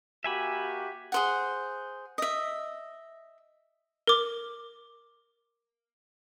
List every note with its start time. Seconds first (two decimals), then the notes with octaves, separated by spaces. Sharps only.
0.24 A#3 F#4 G4 E5 G#5 B5
1.12 G#4 C5 F#5
2.18 D#5 E5
4.07 A#4 D6